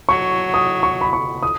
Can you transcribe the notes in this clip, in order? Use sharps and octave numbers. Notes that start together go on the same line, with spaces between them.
F#3 C#6
D#6
C#6
B5
C#6
D#6